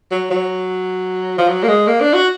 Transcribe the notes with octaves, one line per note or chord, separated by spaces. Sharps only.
F#3
F#3
F3
F#3
A#3
G#3
A#3
D4
F#4